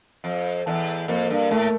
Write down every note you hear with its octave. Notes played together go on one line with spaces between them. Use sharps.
F2
E2 A4
F2 A#3
G2
A2 A3